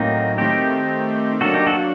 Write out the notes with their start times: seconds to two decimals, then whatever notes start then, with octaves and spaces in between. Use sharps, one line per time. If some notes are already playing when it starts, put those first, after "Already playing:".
Already playing: A2 F#3 A#3 C4 D#4
0.38 D#3 A3 C4 D#4 G4
1.41 F#3 A#3 D4 F#4 A4
1.54 D#4 G4
1.66 F#4 A4
1.79 F#4